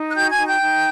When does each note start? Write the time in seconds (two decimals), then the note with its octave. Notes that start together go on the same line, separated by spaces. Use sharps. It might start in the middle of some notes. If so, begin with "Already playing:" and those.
Already playing: D#4
0.09 F#6
0.15 F#4 G5 G6
0.31 G#5 G#6
0.38 D#4
0.46 G5 G6
0.62 D#4